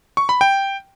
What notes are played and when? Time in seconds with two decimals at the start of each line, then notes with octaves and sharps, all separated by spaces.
0.17 C#6
0.29 B5
0.41 G5